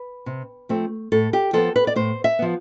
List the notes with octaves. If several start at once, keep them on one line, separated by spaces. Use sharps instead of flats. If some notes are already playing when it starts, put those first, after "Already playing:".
Already playing: B4
C3
F3 A3 C4
A2 A4
G4
F3 B3 A4
B4
D5
A2 C5
E5
F3 B3